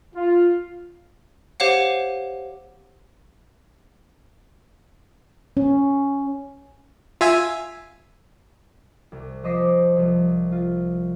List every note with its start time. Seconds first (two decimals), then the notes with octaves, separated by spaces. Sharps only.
0.15 F4
1.60 G4 C5 C#5 F5 F#5
5.57 C#4
7.21 F4 E5 G#5
9.12 C2
9.43 F3 C5 D#5 D6 B6 C7
9.97 C2 F3 G3
10.52 F4